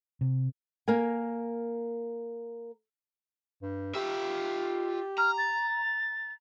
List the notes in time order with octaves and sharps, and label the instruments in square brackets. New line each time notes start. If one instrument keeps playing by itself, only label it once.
[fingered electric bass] C3
[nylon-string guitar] A#3 A#4 G#5
[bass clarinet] G2
[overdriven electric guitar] F4 E5 [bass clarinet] G4
[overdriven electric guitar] A#5 [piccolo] F6
[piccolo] A6